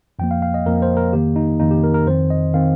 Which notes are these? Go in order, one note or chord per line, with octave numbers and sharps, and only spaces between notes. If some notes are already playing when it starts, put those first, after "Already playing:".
F2 F3 A#3 G5
F5
F5
D#5
F2 F3 A#3 A#4
C5
A#4
F2 D#3 A#3 G4
D#4
F2 D#3 A#3 D#4
G4
A#4
A#4
F2 D#3 C4 C5
D#5
D#3 C4 F5